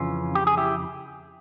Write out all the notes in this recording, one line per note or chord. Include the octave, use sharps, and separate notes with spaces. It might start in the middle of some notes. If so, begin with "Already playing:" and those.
Already playing: F2 C#3 E3 C#4 F4
G4
G#4
E4 G4